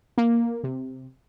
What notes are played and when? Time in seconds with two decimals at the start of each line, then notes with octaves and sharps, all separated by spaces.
0.18 A#3
0.64 C3